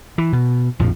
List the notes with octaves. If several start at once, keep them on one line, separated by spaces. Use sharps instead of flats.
E3
B2
A#1 F2 A2 F3